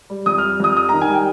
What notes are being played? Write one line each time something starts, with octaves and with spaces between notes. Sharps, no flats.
G3
F2 D#6
G3 F6
F2 D#6
G3 D#6
D#3 A#5
G#5
G3 G5